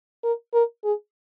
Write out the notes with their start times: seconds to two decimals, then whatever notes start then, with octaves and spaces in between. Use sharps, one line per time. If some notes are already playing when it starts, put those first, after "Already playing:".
0.24 A#4
0.54 A#4
0.84 G#4